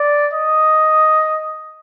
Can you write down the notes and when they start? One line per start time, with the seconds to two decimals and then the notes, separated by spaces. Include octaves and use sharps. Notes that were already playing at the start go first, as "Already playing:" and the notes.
Already playing: D5
0.34 D#5